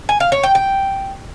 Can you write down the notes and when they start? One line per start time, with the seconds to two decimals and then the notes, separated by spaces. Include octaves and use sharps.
0.09 G#5
0.20 F5
0.32 C#5
0.43 G5
0.55 G5